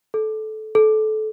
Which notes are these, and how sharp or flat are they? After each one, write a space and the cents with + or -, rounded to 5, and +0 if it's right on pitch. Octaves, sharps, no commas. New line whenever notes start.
A4 -20
A4 -25